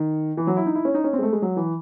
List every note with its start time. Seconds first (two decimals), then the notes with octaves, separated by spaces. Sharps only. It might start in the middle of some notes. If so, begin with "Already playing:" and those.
Already playing: D#3
0.37 E3
0.47 F#3
0.57 E4
0.66 D#4
0.75 E4
0.85 C#4
0.94 D#4
1.04 C#4
1.13 C4
1.19 G#3
1.23 A3
1.33 G#3
1.42 F#3
1.57 E3